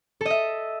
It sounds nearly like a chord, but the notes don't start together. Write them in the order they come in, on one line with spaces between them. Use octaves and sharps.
A4 D#5 E5